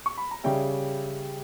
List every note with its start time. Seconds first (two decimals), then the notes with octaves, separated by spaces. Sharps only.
0.06 C#6
0.18 B5
0.31 A#5
0.44 C#3 G3 C#4 E5 G5